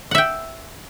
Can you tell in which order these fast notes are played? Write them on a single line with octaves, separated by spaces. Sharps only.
F#5 E5 G5